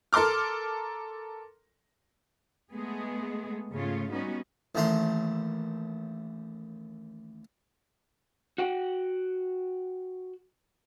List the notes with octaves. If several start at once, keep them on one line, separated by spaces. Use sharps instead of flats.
A4 A#4 C6 D6 F6
G#3 A3 B3 G#4
G#2 C#3 A3 F4 C#5
G3 B3 C#4 D#4 F#4
A1 D#2 A3 A#5 C6
F#4 F#5 G5